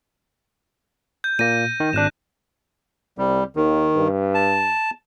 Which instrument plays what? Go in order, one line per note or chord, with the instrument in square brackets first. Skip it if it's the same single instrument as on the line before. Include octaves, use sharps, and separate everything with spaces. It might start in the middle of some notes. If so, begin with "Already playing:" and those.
[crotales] G6
[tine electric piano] A#2 A#3 [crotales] A#6 D#7
[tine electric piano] D#3
[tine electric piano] G#1 D4 [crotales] F#6 E7
[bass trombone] C2 [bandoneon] G3
[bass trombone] D#2 [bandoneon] D#3
[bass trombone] G2
[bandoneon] A5